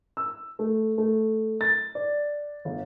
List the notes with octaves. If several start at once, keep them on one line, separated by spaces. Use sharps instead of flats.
E6
A3
A3
A6
D5
G1